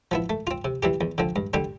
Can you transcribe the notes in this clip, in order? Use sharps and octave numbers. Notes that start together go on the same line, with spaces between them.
F3 B3 E4
A3
C4 F4
C3
E3 G3 C4 G4
E2
D3 F3 C4
G2
D3 G3 C4 G4